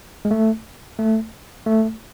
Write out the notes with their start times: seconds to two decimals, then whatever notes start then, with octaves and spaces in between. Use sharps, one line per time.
0.25 G#3
0.31 A3
0.99 A3
1.66 A3